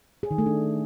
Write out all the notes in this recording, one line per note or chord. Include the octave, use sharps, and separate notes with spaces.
G#4
D#3
A3
D4